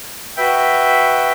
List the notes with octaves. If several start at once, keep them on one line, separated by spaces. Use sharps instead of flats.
F#4 B4 E5 G5